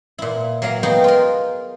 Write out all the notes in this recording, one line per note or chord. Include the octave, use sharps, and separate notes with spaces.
A#2 E4
F#3 A#3 F5 A#5
B3 D#4 F#4 G#4 F#5 G5
F4 A#4